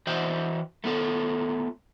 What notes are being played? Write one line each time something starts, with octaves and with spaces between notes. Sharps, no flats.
E3 F#4 C5 D#5 E5 G5
A3 B3 F4 A4